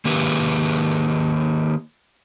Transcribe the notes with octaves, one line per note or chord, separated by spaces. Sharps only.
D#3 A#3 G4 B4